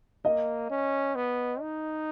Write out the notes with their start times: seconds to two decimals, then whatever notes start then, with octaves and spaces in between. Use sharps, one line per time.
0.25 A#3 D#5
0.70 C#4
1.15 B3
1.61 D#4